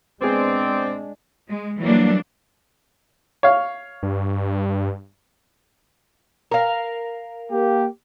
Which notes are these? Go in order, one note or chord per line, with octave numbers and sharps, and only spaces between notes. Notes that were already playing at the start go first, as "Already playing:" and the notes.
G#3 B3 C4 D4 G#4 C5 D5
G#3
E3 F#3 G3 A#3 D4
C#5 F5
G2
A#4 F5
A#3 G4